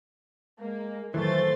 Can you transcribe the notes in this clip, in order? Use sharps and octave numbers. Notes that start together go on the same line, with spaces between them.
G#3 A#3
F2 A2 D#3 E3 F#3 A3 C6 A6